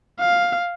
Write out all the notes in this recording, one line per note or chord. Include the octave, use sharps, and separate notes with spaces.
F5